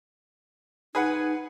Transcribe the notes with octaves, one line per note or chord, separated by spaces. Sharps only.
D#4 G#4 B4 F#5